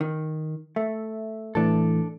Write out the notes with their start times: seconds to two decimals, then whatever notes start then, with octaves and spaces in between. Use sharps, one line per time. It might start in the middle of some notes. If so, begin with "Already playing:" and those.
0.01 D#3
0.76 A3 E5
1.55 A2 E3 A3 D4 A4